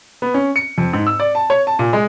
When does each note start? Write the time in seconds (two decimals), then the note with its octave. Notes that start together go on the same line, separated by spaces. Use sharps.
0.22 B3
0.34 C#4
0.56 C#7
0.78 F2
0.93 G#2
1.07 E6
1.20 D5
1.35 A5
1.50 C#5
1.67 A5
1.79 A#2
1.93 G#3